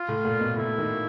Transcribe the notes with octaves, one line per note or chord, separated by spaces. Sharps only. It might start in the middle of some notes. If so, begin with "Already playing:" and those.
Already playing: F4
A2
A#2
B2
A2 E4
D#3